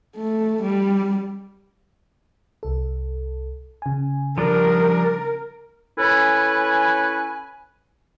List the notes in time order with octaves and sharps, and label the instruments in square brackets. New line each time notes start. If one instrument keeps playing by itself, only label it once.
[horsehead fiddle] A3
G3
[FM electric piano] C2 A4
C#3 G#5
[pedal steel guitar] F3 G3 D4 [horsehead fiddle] A#4
[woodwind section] C#4 E4 A4 B4 G#5